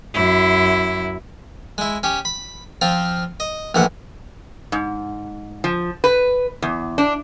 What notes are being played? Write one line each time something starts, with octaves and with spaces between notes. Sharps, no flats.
F#2 E4
G#3 E4
C#4 G4
B5
F3 C4 F4
D#5
A#1 A2 E3 F#5
G#2
F3
B4
E2
D4